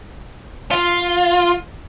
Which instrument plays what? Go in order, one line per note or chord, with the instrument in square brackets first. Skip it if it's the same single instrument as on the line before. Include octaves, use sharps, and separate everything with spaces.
[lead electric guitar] F4